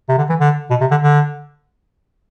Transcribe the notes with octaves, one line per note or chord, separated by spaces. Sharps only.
C3
D3
E3
D3
B2
C3
D3
D3